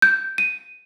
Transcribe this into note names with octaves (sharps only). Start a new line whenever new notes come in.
G6
D#7